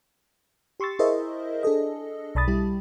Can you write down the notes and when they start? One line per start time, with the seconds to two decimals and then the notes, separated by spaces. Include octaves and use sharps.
0.80 G4 C6 C#6 E6 A6
0.99 E4 G#4 A#4 C5 D#5 E5
1.63 D4 G#4 A4 D#5
2.35 B1 D5 A5 B5 D#6 A6
2.48 G3 E4 G4